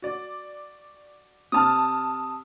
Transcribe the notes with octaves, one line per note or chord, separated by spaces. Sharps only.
F#4 D5
C3 A5 D#6 F6